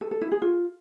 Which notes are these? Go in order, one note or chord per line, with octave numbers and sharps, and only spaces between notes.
A4
A4
E4
G#4
F4